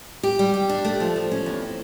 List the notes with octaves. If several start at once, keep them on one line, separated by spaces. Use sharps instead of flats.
G4
G3
G4
D4
A3
F3
F3
C#4
E2
C4